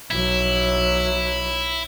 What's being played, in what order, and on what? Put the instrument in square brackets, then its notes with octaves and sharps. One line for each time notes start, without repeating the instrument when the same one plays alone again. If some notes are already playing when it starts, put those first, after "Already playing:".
[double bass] B1 F#3 [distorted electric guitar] E4